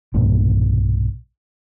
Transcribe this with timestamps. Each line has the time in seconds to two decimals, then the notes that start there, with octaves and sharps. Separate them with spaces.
0.14 B1 G2 A#2 E3